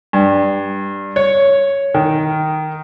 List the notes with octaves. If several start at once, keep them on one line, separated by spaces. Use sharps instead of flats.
G2
C#5
D#3